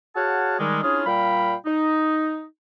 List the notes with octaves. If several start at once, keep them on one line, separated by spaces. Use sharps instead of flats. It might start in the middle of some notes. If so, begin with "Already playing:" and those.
F#4 G#4 C#5 F5 F#5 A5
D#3 G3 G#3
C#4 D4 E4 F4 G#4
A#2 G3 F5 G5 B5
D#4